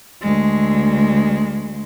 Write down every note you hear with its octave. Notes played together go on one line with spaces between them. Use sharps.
D2 G#3